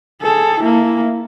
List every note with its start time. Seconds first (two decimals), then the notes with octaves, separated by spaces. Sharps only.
0.22 G#4 A4
0.60 A#3 E4